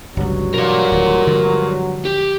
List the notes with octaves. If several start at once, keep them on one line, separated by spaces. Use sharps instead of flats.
G1 C#2 G2 F#3
B2 E3 A#4 D5
D1 D#3
D3 F3 G#3
G4